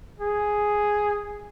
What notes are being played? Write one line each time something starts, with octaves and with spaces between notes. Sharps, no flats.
G#4